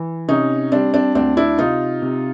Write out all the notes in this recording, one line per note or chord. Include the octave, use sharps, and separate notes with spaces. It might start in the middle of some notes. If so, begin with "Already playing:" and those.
Already playing: E3
C3 C#4 D#4
G3 C4 D4
C4 D4
D2 C4 D4
D4 E4
C3 D#4 F4
C3